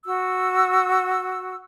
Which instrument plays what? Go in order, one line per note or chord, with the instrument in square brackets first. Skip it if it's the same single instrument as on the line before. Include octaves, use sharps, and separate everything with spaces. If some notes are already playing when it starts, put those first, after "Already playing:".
[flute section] F#4 E6